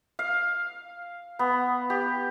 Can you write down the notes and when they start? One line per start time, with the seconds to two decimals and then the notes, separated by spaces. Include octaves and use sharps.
0.19 F5
1.39 B3
1.90 G4